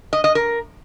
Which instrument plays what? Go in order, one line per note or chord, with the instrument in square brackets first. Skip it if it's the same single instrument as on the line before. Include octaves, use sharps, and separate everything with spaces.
[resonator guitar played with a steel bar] D#5
D#5
A#4